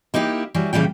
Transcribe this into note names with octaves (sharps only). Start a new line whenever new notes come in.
A#3 D#4 E4 G4
E3 F#3 G3
A#2 C#3 E3 G3 G5